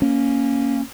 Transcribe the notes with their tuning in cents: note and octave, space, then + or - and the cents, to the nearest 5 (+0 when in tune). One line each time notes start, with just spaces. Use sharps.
A#3 +0 C#4 +0